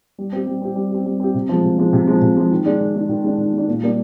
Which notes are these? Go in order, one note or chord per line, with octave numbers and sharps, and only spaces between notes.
G3
C4 G4
G3
C4 G4
G3
C4 G4
G3
C4 G4
C3
F3 G#3
C3
F3 G#3
C3
F3 G#3
C3
F3 G#3
D#3
G#3 D4
D#3
G#3 D4
D#3
G#3 D4
D#3
G#3 D4
A#2
G3 A#3 D4